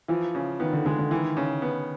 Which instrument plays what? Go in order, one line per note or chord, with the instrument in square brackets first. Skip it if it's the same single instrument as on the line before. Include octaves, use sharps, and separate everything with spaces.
[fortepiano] E3 [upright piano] F3
[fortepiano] C#3
[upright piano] D#3 [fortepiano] B3
[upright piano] D3
[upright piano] D3 [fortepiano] G#3
[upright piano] D3
[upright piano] D#3 [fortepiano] E3
[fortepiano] C#3
B3